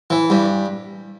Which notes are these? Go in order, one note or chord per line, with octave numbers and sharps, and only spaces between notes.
E3
G2